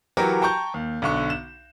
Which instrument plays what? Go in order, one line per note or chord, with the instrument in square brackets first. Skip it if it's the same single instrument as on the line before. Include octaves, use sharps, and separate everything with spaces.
[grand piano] E3 F#3 F#4 G4 A#4 B4
G5 A5 A#5 C#6 G6
D#2
B1 D3 C#6
E7